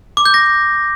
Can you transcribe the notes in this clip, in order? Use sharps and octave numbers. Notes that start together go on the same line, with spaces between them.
D6
G6
A#6